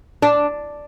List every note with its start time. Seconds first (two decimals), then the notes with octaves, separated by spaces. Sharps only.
0.22 D4